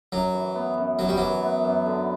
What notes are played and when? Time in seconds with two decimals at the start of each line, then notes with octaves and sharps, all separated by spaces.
0.12 F#2 F#3
0.34 E3
0.56 B3
0.78 F#2
0.99 F#2 F#3
1.09 G3
1.17 E3 F#3
1.42 B3
1.65 F#2
1.86 D3